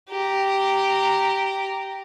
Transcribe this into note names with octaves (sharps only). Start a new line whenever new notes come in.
G4 A#5